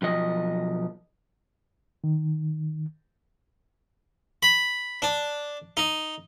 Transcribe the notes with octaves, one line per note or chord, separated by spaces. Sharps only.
B1 F3 D#5
D#3
B5
D4
D#4